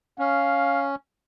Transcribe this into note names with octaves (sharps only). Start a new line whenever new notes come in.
C#4 F5